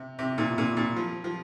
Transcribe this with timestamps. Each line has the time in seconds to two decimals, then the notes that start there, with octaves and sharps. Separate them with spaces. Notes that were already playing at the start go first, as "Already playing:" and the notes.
Already playing: C3
0.19 C3
0.38 A#2
0.58 A#2
0.77 A#2
0.96 F3
1.24 F3